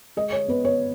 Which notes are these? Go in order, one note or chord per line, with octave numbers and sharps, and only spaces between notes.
G#3 D#5
C#5
B3 B4
C#5